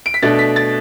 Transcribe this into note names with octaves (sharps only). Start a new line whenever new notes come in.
D7
B6
B2 A3 D4 A6
B6
A6